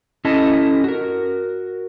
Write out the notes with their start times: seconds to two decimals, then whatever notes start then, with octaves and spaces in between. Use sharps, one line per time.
0.25 C#4 E4 A4 D#5 A5
0.84 F#4 A#4